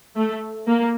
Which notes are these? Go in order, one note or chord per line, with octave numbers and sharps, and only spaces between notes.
A3
A#3